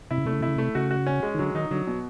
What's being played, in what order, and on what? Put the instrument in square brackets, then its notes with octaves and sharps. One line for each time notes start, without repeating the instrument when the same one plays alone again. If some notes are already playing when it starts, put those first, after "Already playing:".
[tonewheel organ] C3 [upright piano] E4
[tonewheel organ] C#3
[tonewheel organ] C3 [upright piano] A3
[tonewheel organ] C#3
[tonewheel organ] C3 [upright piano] E4
[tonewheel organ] C#3
[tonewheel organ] C3 [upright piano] A3
[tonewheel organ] C#3 [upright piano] F#4
[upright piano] F#4
C#4
G#3
[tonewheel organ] D#3
[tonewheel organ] D3 [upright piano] F#3
[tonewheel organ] D#3 [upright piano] D#4
[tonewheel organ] D3 [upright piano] F#3
[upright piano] B2